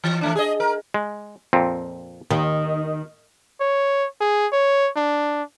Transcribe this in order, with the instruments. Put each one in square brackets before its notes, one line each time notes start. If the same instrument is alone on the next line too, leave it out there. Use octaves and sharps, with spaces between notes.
[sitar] E3
E3 A3 D4
G#4 D#5
A#4
[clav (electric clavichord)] G#3
F2 A#2 C4
[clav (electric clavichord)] D#2 [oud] D#3
[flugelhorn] C#5
G#4
C#5
D4